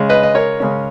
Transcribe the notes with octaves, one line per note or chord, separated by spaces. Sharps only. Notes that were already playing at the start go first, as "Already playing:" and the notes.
Already playing: C#3 G#3 C#4
B4 D#5
D#5
A#4 C#5
C#3 G#3 C#4